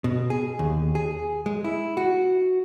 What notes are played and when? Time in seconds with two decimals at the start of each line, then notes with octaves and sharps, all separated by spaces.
0.04 B2
0.30 G#4
0.59 D#2
0.95 G#4
1.46 G#3
1.64 E4
1.97 F#4